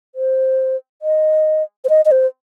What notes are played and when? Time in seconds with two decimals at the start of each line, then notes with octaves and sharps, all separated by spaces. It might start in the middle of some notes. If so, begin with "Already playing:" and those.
0.15 C5
1.02 D#5
1.84 C5
1.89 D#5
2.05 D#5
2.11 C5